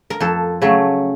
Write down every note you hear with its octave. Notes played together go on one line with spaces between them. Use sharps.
A#4
F2 A4
C#3 F#3 A3